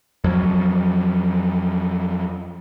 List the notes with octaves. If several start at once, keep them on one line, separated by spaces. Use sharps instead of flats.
F2 F#3